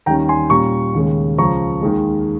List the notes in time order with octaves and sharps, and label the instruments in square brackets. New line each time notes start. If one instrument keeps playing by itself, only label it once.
[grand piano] D#2 D#3 G3 C#4 G5 A#5
G#5 C6
A#2 G3 C#4 A#5 C#6
D#2 C#3 G#3 C#4
C#2 C#3 F3 A#5 C#6
D#2 D#3 G#3